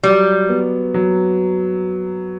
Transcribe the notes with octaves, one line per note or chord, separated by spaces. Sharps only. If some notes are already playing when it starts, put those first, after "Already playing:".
F#3 G3
B3
F#3